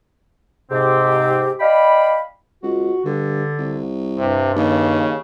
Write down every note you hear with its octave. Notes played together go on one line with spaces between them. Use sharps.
G#2 C3 C4 G4
D5 D#5 F5 G5 B5
C#2 F#4
G2 D3
C2
G2 C3
D#2 C#3